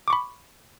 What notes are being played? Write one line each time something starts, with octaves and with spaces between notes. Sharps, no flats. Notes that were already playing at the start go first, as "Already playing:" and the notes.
B5 C#6 D6